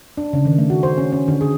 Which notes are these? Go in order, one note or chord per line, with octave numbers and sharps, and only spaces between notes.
D4
C#3
D#3
A3
F#4
C5
C#4
C#4
D3
G#4